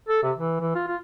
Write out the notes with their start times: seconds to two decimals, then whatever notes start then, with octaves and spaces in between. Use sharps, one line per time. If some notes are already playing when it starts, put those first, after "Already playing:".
0.09 A4
0.23 C3
0.37 E3
0.61 E3
0.75 F4
0.88 F4